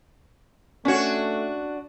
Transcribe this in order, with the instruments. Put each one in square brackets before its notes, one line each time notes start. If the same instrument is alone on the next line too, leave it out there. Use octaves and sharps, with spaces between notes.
[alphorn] A3 [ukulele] C#4 C#5 [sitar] D4 F#4